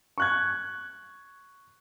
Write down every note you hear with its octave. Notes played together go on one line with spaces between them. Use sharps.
C#6 F#6 G#6